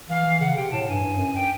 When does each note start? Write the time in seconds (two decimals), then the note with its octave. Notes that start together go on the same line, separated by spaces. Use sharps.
0.09 E3 F5
0.25 E3
0.41 C#3 F#5
0.56 C3 G5
0.71 A2 A5
0.88 G2 G#5
1.03 G2
1.16 F#2
1.35 G5